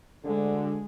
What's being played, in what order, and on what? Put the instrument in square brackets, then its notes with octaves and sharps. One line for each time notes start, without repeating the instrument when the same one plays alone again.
[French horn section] D2 D3 [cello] G#3